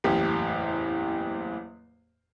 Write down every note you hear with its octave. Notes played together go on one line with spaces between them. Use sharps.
F#1 E2 A2 G4